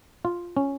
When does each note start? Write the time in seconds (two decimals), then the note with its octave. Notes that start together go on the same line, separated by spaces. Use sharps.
0.25 F4
0.57 C#4